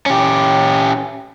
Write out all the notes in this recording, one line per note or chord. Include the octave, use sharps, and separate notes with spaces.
C#4 G4